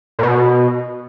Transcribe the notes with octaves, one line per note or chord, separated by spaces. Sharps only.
A#2
B2